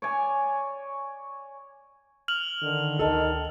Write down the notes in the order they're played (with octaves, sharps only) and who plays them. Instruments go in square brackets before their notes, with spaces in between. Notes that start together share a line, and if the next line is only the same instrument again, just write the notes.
[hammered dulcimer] C#5 D5 G#5
[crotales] F6 F7 F#7
[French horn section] D3 D#3
[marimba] D2 D#5 A5 [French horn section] D#3 [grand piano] A4